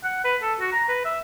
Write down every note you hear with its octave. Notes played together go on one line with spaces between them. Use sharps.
F#5
B4
A4
F#4
A#5
B4
E5